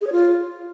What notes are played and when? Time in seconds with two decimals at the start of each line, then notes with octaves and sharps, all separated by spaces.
0.01 G#4
0.07 C#5
0.12 F4